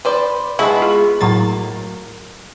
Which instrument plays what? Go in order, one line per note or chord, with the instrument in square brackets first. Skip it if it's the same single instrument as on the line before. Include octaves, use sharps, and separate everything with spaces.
[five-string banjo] B4 C5 D5
[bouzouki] G#3 B3 A5 [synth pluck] E4 [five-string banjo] F#4 B4
[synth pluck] F4
[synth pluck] A2 F#3 A6 [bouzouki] A#3